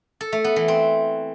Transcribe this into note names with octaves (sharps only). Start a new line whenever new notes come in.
A4
A3
B3
E3
C4